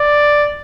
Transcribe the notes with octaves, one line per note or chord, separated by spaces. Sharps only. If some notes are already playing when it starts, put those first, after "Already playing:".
Already playing: D5